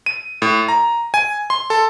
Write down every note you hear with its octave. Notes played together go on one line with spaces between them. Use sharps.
D#7
A2
A#5
G#5
C6
A4